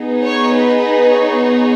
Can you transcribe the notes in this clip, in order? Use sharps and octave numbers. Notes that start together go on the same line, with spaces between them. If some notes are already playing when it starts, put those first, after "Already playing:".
Already playing: B3 D#4 G#4
C#5
B4
C#5